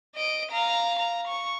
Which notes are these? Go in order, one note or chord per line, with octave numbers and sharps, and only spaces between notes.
D#5 D7
F5 A#5
A#5
C#6